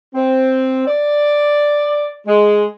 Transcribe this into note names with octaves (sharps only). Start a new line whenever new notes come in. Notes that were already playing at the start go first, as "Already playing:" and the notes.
C4
D5
G#3